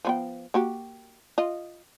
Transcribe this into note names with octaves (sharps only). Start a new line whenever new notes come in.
F3 B3 G5
A#3 F#4 G4
F4 D#5